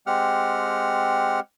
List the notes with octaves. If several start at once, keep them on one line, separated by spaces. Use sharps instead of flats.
G#3 C4 G4 F#5 F6